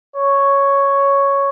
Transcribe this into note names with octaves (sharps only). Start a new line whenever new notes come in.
C#5